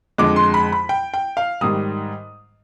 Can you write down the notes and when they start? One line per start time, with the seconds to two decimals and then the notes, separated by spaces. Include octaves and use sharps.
0.18 F2 D3 G#3 D6
0.36 C6
0.54 B5
0.72 B5
0.89 G5
1.14 G5
1.37 F5
1.61 G#2 D#3 G3 D#6